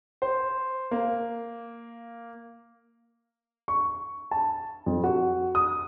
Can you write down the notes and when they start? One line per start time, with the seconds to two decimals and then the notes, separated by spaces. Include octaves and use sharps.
0.22 C5
0.91 A#3
3.68 C#6
4.31 A5
4.86 F2
5.04 F#4
5.55 D#6